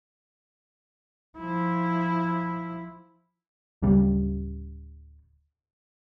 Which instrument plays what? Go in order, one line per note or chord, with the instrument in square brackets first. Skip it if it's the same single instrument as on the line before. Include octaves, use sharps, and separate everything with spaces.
[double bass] F3 E4
[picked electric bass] D1 C#3 G3